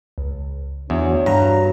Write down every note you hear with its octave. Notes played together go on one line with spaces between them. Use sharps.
C#2
E2 D4 F#4 C#5
G2 A#5